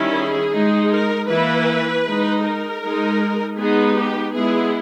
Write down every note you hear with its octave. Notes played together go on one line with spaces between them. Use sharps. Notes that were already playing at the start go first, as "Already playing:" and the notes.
Already playing: D#3 G3 C#4 E4
G#4
G#3 D#4
A#4
E3 A#3 E4 B4
G#3 D#4
A#4
G#3 D#4
G#3 B3 D#4 G#4
G4
G#3 B3 E4 G#4